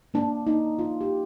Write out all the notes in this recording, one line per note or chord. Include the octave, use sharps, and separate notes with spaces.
A#3 D4
A#3 D#4
F3 F4
G4